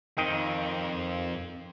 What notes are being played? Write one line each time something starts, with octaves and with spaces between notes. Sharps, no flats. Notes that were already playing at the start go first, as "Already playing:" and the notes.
F2 D#3 C4 D#5 G5